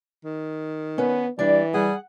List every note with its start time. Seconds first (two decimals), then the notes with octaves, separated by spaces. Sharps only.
0.24 D#3
0.98 B3 C#4 B4
1.39 E3 G3 D4 D5
1.74 G3 G#4 F#5